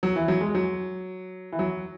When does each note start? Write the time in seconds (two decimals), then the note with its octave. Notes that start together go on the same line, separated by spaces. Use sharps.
0.03 F#3
0.16 E3
0.28 F#3
0.41 G#3
0.55 F#3
1.52 E3
1.59 F#3